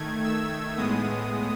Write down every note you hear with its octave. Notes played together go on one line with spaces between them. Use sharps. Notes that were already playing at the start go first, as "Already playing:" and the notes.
Already playing: D#3 A3 G#6
E6
A2 G#3 B3 D#6